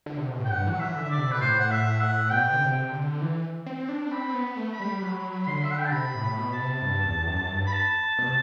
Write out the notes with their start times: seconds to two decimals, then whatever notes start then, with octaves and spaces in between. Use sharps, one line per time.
0.06 D3
0.17 C3
0.28 B2
0.39 A2
0.45 G5
0.50 G2 F#5
0.67 E3
0.71 F#3 F#5
0.80 E5
0.87 E3
0.95 D3
1.04 E5
1.10 D5
1.18 C3
1.30 B2 B4
1.41 A2 C5
1.59 F#5
1.71 E5
2.01 F#5
2.31 B2 G5
2.52 D3
2.60 C3
2.91 D3
3.21 E3
3.66 C4
3.89 D4
4.11 C4 B5
4.34 B3
4.57 A3
4.71 B5
4.80 G3
5.02 F#3 B5
5.43 B5
5.47 D3 C6
5.63 E5
5.71 F#5
5.78 G5
5.85 A5
5.92 C3 B5
6.15 A2
6.22 B5
6.38 B2
6.53 A5
6.61 C3
6.82 G2
7.06 E2
7.27 F#2
7.50 G2
7.66 B5
7.72 A5
8.19 B2
8.26 C3